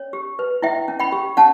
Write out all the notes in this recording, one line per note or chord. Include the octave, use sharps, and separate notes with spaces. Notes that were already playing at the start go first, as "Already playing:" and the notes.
Already playing: C#4 C#5
G4
B4
E4 E5 G5
C#4
G5 B5
G4
C#4 F#5 A5